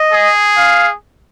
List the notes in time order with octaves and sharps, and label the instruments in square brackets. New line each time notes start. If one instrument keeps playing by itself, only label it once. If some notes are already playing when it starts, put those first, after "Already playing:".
Already playing: [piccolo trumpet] D#5
[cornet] G#4
[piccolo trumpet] F5